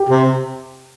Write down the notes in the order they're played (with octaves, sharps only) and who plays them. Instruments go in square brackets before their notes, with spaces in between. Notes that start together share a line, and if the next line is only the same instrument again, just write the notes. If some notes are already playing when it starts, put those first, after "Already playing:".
Already playing: [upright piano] G4
[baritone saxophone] C3